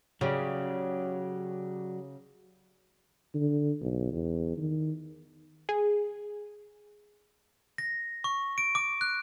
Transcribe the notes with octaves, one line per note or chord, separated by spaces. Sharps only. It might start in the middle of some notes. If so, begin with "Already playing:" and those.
C#3 F#3 G4 D5
D3
B1
E2
D#3
G#4
A#6
C#6
D7
D6
F#6